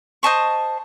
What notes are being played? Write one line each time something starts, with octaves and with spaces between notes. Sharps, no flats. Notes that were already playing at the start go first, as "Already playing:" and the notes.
C5 D#5 A5 C#6